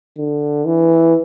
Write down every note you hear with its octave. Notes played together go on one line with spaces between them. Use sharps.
D3
E3